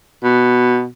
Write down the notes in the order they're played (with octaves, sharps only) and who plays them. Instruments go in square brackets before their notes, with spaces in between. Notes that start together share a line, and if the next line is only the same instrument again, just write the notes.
[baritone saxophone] B2